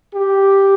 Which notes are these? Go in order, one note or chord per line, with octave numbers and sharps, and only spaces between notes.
G4